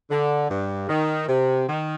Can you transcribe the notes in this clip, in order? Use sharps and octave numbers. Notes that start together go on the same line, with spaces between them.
D3
G2
D#3
C3
D#3